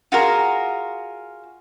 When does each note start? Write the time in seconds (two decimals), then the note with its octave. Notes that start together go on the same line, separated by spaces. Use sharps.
0.12 F4 F#4 G#4 A#4